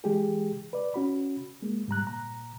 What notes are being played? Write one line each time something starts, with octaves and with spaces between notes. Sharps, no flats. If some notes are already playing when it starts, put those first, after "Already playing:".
E3 G#3 G4 G#4
B4 D5
C#4 F#4 B5
G#3 A#3
G#2 G3 A#5 F#6
A#2 A#5